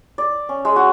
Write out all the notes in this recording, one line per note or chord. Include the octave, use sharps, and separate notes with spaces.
D5
C#4
G#3
F#4